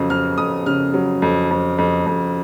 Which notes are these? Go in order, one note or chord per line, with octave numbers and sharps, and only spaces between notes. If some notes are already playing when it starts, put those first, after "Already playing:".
Already playing: F2 C#3 F#3
F2 F6
F2 D#6
C#3 F6
F#3
F2
F2
F2
F2